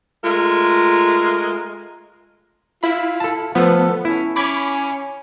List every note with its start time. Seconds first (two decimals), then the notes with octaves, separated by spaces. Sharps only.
0.24 G#3 A3 F4 A#4
2.83 E4 F4 B5
3.20 A4 A5
3.55 F3 A3 B3 A4
4.05 C#4 E4
4.36 C#4 B5 D6 G#6